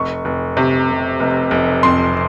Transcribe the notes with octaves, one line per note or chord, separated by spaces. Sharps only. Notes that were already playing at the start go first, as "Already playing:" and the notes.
Already playing: F1 C#6
F1
C3
F1
F1
F1
F2 C6